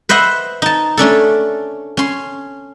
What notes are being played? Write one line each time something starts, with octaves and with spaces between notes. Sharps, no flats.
B4 C5 D#5 E5 F#5
D#4 A5
A3 C#4 D4 A4
C#4 C6